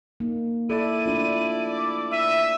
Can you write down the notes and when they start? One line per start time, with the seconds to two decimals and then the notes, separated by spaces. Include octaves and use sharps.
0.20 A#3 D#4
0.70 E4 A4 D5 D#7
1.06 A3 D4 F4
1.71 D6
2.12 E5 D#7